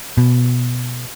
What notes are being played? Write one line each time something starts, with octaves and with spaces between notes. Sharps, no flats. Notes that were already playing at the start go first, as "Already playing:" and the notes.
B2